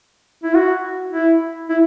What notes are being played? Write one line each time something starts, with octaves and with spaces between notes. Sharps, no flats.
E4
F#4
E4
E4